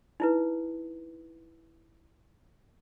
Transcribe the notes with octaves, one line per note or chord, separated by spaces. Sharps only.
D#4 E4 B4